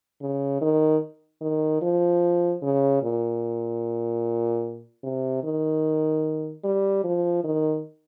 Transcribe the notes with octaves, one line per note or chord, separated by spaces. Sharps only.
C#3
D#3
D#3
F3
C#3
A#2
C3
D#3
G3
F3
D#3